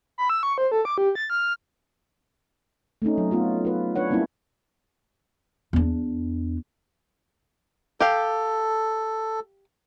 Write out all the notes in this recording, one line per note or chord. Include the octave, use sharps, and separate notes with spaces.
B5
E6
C#6
C5
A4
D6
G4
A6
F6
A3 C4 C#4 D#4
F#3
B3 F4 F#4
F4 B4
D4 B4 C#5 F#5
G3 A#3 C4 C#4 E4
E2 D4
G4 A4 F5